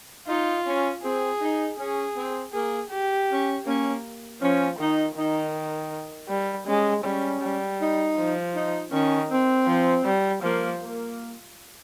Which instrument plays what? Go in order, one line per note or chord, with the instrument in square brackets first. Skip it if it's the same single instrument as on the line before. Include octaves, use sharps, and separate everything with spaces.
[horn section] D#4 [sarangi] F4
[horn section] C#4
[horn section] C4 [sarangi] G#4
[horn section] D#4
[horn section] C#4 [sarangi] G#4
[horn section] C4
[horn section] A#3 [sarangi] G#4
[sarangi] G4
[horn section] C#4
[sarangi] A#3 [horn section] C#4
[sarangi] F3 [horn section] C#4
[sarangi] D#3 [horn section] D#4
[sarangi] D#3 [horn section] D#4
[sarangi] G3
[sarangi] G#3 [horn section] C#4
[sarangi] G3 [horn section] C#4
[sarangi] G3
[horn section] D#4
[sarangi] F3
[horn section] D#4
[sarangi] D#3 [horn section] C#4
[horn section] C4
[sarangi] F3
G3
[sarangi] F3 [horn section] A#3
[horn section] A#3